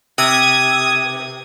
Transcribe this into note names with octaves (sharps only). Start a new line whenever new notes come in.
C3 D#6 G#6